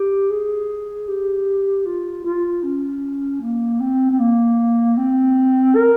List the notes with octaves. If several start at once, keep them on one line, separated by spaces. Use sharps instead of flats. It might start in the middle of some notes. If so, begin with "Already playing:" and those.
Already playing: G4
G#4
G4
F4
F4
C#4
A#3
C4
C4
A#3
C4
A#4